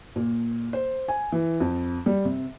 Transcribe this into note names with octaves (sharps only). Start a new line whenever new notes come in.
A#2
C5
G#5
E3
F2
G3
C3